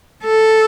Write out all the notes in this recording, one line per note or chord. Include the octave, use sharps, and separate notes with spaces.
A4